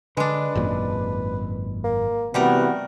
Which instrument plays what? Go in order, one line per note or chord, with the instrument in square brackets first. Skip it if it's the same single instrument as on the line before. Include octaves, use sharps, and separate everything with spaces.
[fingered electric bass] D3 [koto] G#3 D4 [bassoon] B4
[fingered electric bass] G#1 F#2 A#2
[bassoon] A#3
[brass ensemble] C3 E3 B3 [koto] G3 A3 A#4 [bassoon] F#4